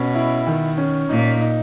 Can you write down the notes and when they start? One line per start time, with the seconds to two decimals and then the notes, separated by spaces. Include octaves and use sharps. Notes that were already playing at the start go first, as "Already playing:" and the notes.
Already playing: B2 C#4
0.15 E4
0.47 D#3
0.78 C#4
1.09 A#2 D#4
1.41 D#4